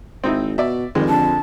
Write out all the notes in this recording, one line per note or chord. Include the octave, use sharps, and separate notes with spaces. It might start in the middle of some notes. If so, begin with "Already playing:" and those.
G#1 C4 D#4 E4
B2 D5 E5
F2 D#3 G3 G#3
D3 A5